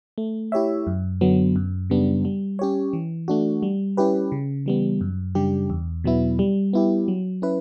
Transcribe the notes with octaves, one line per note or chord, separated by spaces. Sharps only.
A3
E4 G4 C#5 E5
F#2
D3 F#3 B3
F#2
C#3 G3 B3 D4
G3
C#4 G4 C#5
E3
A3 D4 F#4
G3
C#4 E4 G4 B4
C#3
E3 G3 B3
F#2
C#3 G3 D4 G4
E2
B2 F#3 B3 E4
G3
B3 E4 G4
F#3
C#4 E4 B4